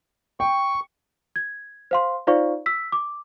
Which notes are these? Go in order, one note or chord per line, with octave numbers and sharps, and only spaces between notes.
G5 C#6
G#6
C5 F5 C6
D#4 F4 C5 D5 F5 C#6
E6 B6
D6